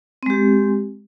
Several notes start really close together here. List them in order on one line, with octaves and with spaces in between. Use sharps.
C4 G#3 G4